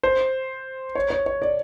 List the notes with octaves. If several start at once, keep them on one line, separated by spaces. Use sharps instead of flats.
C5
C#5
C#5
C#5
D5